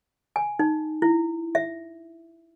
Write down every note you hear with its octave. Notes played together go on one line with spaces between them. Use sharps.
G#5
D#4
E4
E5